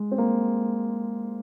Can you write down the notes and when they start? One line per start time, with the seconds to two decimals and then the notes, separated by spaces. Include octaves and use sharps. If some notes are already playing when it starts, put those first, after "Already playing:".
Already playing: G#3
0.12 C4
0.18 A#3